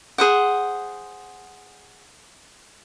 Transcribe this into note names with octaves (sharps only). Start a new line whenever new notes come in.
G#4 C5 F#5